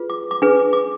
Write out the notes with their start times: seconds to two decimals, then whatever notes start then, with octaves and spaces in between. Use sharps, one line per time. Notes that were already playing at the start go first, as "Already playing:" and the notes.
Already playing: F4 G#4 B4
0.10 D6
0.31 D6
0.42 D4 G#4 B4
0.73 D6